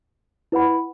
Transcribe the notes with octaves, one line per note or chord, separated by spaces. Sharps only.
E4 B4 F#5 B5